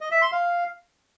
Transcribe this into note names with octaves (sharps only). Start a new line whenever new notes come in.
D#5
E5
C6
F5